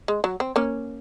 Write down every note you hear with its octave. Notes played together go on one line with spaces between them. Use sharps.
G#3
F#3
C4
A#3 C#4